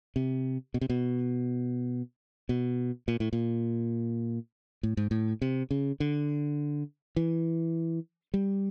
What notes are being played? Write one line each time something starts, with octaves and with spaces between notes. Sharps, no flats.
C3
B2
C3
B2
B2
A#2
A2
A#2
A2
G#2
A2
C3
C#3
D3
E3
G3